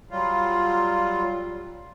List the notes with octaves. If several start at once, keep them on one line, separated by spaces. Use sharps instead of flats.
F#3 G3 F4